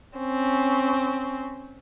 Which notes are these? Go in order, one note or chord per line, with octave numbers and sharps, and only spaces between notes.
C4 C#4